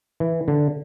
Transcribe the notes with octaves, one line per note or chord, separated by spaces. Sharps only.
E3
D3